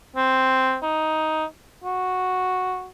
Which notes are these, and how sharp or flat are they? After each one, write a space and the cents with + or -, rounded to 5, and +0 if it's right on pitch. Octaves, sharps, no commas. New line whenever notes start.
C4 +0
D#4 +10
F#4 -5